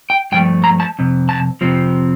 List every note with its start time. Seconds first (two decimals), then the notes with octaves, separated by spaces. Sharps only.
0.10 G5
0.32 G2 F3 A3 G5
0.64 A#5
0.80 A5
0.99 F2 C3
1.29 A5
1.61 F2 C3 F3 C4